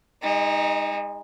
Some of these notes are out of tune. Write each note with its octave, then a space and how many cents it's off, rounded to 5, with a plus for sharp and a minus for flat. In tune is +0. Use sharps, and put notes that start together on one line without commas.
G#3 -40 D#4 +10